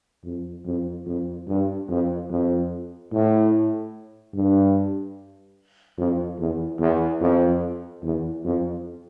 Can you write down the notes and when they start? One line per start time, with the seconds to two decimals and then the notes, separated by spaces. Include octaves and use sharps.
0.24 F2
0.65 F2
1.06 F2
1.47 G2
1.88 F2
2.30 F2
3.12 A2
4.34 G2
5.98 F2
6.39 E2
6.80 E2
7.21 F2
8.02 E2
8.44 F2